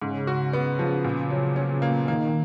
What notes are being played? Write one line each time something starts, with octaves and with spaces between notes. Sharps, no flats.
G#2 C#3
F#4
B3
F3
A#2
F#3
C#4
A#3
D#3 A#3